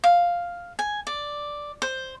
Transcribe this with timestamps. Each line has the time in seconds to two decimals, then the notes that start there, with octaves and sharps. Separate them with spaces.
0.04 F5
0.79 G#5
1.07 D5
1.82 C5